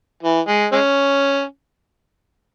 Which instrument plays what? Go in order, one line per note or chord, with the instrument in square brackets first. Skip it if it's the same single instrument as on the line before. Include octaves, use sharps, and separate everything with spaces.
[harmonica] E3
G#3
G#3 C#4